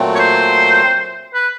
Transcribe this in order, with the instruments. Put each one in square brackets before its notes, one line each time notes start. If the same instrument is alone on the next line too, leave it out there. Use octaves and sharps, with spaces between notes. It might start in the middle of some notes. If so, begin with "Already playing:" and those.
Already playing: [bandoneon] A#2 F#3 A3 C4
[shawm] C#5
C5
B4